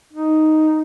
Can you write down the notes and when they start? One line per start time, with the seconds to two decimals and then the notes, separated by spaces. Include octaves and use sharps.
0.13 D#4